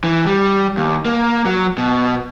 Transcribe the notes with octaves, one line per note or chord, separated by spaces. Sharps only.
E3
G3
D#2
A#3
F#3
B2